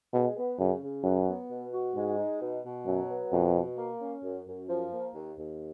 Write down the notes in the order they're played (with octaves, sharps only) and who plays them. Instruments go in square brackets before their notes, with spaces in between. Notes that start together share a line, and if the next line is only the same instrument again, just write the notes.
[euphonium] B2 [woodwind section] G#3
[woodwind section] B3
[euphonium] F#2 [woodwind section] C#3
[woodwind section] C#3
[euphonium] F#2 [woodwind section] F#3
[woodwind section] B3
B2
F#4
[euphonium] G#2 [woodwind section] G#3
[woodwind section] D#4
B2
B2
[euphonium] F#2 [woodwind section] F#3
[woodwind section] B3
[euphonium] F2 [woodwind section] B2
[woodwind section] B2
A#3
C#4
F#2
F#2
F3
A#3
D#2
D#2